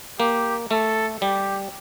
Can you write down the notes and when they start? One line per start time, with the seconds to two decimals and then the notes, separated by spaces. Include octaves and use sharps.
0.19 A#3 G4
0.71 A3 A4
1.22 G3 G4